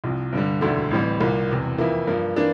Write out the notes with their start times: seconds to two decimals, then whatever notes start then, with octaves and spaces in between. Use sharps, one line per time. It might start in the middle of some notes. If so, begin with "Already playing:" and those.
0.04 C2 C3 F3
0.33 G2 D3 G3
0.61 E1 D2 D3 A3 E4
0.91 A1 A2 E3 G3 C4
1.20 C2 A#2 G3 A#3
1.49 E1 E2 C3
1.78 F2 E3 A#3 E4
2.07 G2 F3 A#3
2.36 E3 A#3 D4